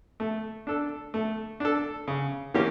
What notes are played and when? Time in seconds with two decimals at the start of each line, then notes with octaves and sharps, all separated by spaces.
0.20 A3
0.67 D4 A4
1.14 A3
1.60 D4 A4
2.08 C#3
2.54 E3 A#3 C#4 G4